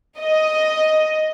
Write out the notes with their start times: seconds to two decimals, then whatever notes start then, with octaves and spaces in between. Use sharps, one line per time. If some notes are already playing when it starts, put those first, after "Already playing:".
0.19 D#5